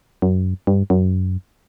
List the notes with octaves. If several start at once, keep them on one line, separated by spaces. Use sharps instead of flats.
F#2
G2
F#2